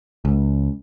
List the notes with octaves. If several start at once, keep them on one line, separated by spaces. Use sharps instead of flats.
C#2